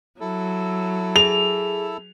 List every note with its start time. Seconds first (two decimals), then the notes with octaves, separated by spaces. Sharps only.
0.20 F#3 E4 A4
1.16 G#4 F7